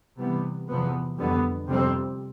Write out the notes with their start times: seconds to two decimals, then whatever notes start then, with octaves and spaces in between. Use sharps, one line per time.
0.18 C3 E3 G3 B3
0.68 E2 C3 F3 B3
1.18 F2 D3 G3 B3
1.68 F2 C3 G3 C4